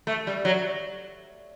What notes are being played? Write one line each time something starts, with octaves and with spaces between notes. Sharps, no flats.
A3
G3
F#3